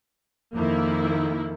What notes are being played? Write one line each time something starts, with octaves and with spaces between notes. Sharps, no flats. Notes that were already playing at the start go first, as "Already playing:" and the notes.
F2 D#3 A#3 E4